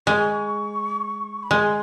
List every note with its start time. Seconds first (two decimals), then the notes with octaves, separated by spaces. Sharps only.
0.07 G#3 C#6
1.43 B5
1.50 G#3 C6